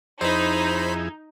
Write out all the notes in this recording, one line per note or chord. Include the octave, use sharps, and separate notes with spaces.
F2 D#4 E4 G#4 C5 B5